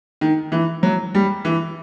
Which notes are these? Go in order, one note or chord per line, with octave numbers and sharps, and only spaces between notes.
D#3
E3
F#3
G3
E3